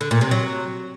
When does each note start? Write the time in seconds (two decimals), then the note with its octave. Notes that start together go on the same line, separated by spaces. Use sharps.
0.01 D3
0.11 A#2
0.21 C3
0.31 F#3